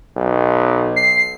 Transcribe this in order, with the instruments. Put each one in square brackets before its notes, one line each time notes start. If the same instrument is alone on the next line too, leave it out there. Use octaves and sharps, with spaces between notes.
[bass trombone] B1
[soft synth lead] C7